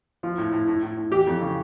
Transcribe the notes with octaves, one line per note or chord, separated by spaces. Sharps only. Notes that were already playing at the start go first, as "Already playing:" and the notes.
F3
A2
A2
A2
A2
A2
E3 G4
F2
C#3